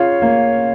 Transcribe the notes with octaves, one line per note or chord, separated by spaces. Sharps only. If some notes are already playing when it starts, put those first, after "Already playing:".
Already playing: C#3 F4 C#5 F5
A#3